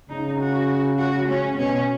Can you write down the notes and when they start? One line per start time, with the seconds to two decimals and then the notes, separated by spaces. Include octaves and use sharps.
0.09 C#3 D#4
0.39 F#4
0.98 F#4
1.28 C#4
1.57 B2 C#4